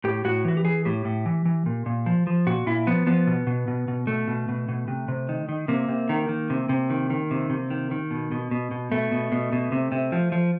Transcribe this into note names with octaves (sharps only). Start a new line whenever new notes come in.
A2 G4
A2 F#4
E3 F#4
G4
E3 G#4
A2 G4
A2
E3
E3
A#2
A#2
F3
F3
A#2 F#4
A#2 E4
F3 B3
F3 B3
B2
B2
B2
B2
B2 A3
B2
B2
B2
C3
C3
D#3
D#3
C3 A#3
C3
D#3
D#3
C3
C3
D#3
D#3
C3
C3
D#3
D#3
B2
B2
B2
B2
B2 A3
B2
B2
B2
C3
C3
F3
F3